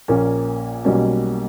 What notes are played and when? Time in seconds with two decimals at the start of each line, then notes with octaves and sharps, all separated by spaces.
0.08 A#1 A#2 A#3 C#4 A#4
0.85 B1 B2 G3 A#3 C#4